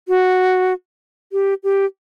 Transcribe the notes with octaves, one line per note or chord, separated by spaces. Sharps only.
F#4
G4
G4